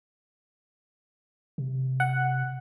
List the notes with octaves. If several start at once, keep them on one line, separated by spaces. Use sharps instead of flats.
C3
F#5